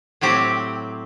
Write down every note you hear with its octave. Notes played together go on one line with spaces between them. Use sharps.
A2 F#3 C4 G4